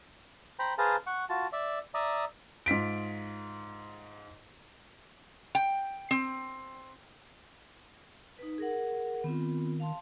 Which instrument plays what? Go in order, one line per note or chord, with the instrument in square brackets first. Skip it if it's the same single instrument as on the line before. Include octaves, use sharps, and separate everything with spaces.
[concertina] C5 G5 A#5 B5
G#4 B4 C5 F5 A5 A#5
F#5 C#6
F4 F#4 A5
D5 E5
D5 E5 A#5 D#6
[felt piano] G#2 F4 B6 D7
[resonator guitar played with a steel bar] G5
C4
[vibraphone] D#4 B4
G#4 A#4 F#5
[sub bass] D#3 [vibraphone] B3 C4 F4
[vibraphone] F5 A5 C6